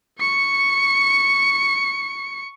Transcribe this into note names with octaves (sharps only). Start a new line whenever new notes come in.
C#6 C#7